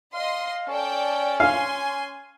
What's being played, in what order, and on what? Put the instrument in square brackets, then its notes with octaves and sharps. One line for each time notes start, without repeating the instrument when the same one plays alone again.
[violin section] D#5 C6 [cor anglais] F5
[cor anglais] C#4 [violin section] A4 D5 G5
[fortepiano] F5 [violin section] G#5 C6